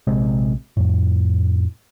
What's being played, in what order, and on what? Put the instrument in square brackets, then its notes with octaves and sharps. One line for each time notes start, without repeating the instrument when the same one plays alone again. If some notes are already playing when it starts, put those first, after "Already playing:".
[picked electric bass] A#1 C3 G#3 C4
F2 A2